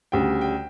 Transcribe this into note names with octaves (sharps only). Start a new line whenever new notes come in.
D2 C#3 G3 G5
G5